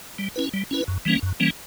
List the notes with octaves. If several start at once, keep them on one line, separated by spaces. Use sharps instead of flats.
G3
C#4 E4 B4
G3
C#4 E4 B4
F#2
E3 G3 A#3 C#4
F#2
E3 G3 A#3 C#4